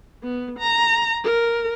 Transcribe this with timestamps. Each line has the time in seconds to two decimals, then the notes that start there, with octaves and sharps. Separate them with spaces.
0.23 B3
0.59 A#5
1.24 A#4